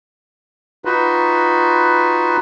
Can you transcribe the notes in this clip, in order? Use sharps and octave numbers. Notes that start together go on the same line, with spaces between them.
D#4 F4 F#4 B4